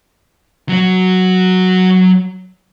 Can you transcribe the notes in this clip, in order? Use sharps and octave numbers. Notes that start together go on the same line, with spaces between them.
F#3 F#4